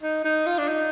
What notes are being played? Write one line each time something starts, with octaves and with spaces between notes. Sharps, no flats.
D#4
D#4
F4
D4
D#4